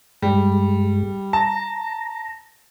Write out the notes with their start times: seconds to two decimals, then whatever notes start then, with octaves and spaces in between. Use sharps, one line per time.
0.22 G2 G3 G#3
1.33 A5 A#5